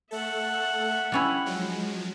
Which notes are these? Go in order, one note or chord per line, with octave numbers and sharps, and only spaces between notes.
A3 A4 E5 F#5
G3 C#4 E4
F3 F#3 G#3